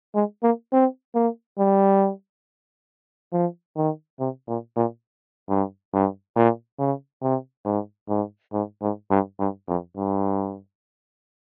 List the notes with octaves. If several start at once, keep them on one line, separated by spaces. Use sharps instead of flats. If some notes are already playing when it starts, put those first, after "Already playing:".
G#3
A#3
C4
A#3
G3
F3
D#3
C3
A#2
A#2
G2
G2
A#2
C#3
C3
G#2
G#2
G#2
G#2
G2
G2
F2
G2